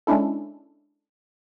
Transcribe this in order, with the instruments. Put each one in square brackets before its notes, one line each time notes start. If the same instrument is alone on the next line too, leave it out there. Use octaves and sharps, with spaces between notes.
[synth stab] G#3 C#4 D4 E4 A4